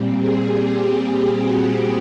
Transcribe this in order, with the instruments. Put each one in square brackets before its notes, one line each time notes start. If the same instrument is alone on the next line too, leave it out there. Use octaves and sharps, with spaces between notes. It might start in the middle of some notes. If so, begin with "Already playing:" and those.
Already playing: [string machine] A#2 G3 C4
G#4
G4
F#4